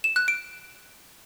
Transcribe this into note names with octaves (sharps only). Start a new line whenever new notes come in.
E7
F#6
D7